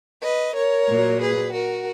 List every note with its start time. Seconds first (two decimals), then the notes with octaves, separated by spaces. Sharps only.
0.22 B4 D#5
0.55 A#4 C#5
0.88 A#2 F#3
1.21 G#4 B4
1.53 F#4 A#4